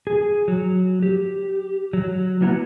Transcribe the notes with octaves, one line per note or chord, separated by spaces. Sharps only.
G#4
F#3
G4
F#3
F#3 A#3 B3 E4 F#5 A#5